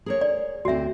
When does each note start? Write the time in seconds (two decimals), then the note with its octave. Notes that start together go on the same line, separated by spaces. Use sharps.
0.06 G#4 A#4 C#5
0.21 D5
0.65 D2 C4 F#4 E5